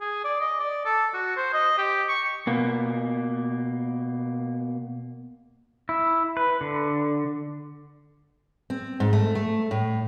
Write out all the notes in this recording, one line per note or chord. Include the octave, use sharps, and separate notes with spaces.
G#4
D5
D#5
D5
A4
F#4
C5
D#5
G4
C#6
B2 A#3
E4
B4
D3
C4
G#2
A3
A3
A2